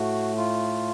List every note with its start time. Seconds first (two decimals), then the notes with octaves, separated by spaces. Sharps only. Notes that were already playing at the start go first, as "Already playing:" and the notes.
Already playing: A2 A3 F#4
0.37 F4